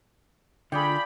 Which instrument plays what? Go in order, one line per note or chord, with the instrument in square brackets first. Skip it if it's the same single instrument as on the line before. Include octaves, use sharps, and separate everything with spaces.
[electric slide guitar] D3 [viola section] F4 B5 [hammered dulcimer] G#4 D5 G5